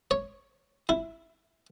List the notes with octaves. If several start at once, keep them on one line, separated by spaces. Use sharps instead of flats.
C#5
E4